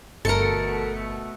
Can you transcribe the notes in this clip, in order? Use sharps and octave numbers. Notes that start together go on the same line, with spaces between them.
G1 B2 A3 A4 A#4 C#7